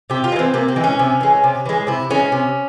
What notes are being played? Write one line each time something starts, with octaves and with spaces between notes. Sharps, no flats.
C3 G4
F4
G#3
E3 C4
C3 A#3
C4
E3 G#3
C#4
C3
E3 G#3
C3
E3 G#3
C3 E4
E3 G#3 C#4
C3